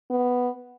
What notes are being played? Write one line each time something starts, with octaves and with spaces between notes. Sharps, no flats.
B3